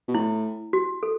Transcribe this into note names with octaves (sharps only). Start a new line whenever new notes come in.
B2
A2 E4
F#4
A4